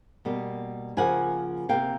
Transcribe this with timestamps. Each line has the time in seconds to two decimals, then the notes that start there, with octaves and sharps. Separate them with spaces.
0.25 B2 G3 A#3
0.97 C#3 F3 A#3 F#5 G#5
1.69 C3 F3 A#3 F5 G5